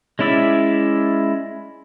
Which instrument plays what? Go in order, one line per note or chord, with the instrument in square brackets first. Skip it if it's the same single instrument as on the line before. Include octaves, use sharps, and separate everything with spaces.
[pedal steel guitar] G#3 C#4 E4 D5 E5